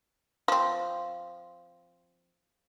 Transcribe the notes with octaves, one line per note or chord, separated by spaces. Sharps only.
F3 C4